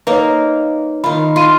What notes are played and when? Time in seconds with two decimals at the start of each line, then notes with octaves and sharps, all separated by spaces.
0.07 A#3 D#4 A#4 B4 C#5
1.04 D#3 F4 B5
1.36 F4 C6 D#7